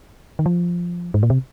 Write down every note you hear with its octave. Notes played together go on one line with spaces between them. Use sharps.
D#3
F3
G#2
A#2
C3